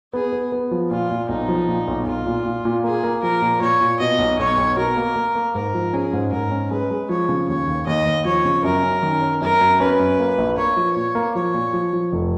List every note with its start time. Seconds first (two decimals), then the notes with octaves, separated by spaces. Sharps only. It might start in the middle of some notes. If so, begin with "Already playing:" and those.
0.13 B3 G#4
0.32 B3
0.52 B3
0.71 F3
0.90 A#2 F4
1.11 A#2
1.29 B1 D#4
1.48 F3
1.68 A#2
1.88 B1
2.06 B1 F4
2.26 A#2
2.46 A#2
2.65 A#2
2.84 A#3 G#4
3.03 A#3
3.22 F3 A#4
3.42 A#2
3.61 A#2 C#5
3.81 A#2
4.00 B2 D#5
4.19 B1
4.39 B1 C#5
4.57 B1
4.77 B2 A#4
4.97 A#3
5.16 A#3
5.35 A#3
5.55 G#2 A#4
5.74 F3
5.93 C#4 G#4
6.13 G#2
6.32 G#2 A#4
6.51 C#4
6.71 G#3 B4
6.91 G#3
7.09 F3 C#5
7.29 C#3
7.48 D#2 C#5
7.67 D#2
7.87 D#2 D#5
8.06 D#2
8.25 F3 C#5
8.45 C#3
8.64 F#2 A#4
8.83 C#4
9.03 D#3
9.22 C#4
9.41 F#2 A#4
9.61 F#2
9.80 C#4 B4
9.99 F#2
10.19 A#3
10.38 A#1
10.57 A#3 C#5
10.77 F3
10.96 A#2 C#5
11.15 A#3
11.35 F3 C#5
11.54 A#2
11.73 F3
11.93 F3
12.12 F1